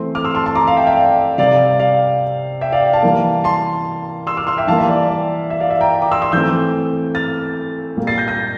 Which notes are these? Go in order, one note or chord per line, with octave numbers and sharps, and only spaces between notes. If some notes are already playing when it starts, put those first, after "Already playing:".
Already playing: E3 A3 C4 C6
D6 F6
C6 E6
A5 C6
A5 C6
A#5 D6
F5
E5 G5
E5 G5
D5 F5
C3 G3 C4 D5 F5
D5 F5
E5 G5
D5 F5
F5 A5
E3 G3 A#3
A5 C6
C6 E6
D6 F6
C6 E6
E5 G5
E3 G3 A#3 F5 A5
E5
D5
D5
E5
D5 F5
E5
G5 A#5
A#5 D6
C6 E6
C6 E6
E3 A3 C4 E6 G6
F6 A6
A#2 G3 A#3
A6 C7
G6 A#6
G6 A#6